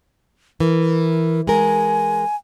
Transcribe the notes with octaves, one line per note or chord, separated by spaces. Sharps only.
E3 A#4
G#3 A#4 G#5